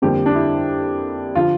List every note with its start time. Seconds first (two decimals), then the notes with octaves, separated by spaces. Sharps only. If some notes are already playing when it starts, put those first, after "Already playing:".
0.02 F2 D3 G3 A#3 G4
0.26 D4
0.35 E4
1.35 D3 F3 F4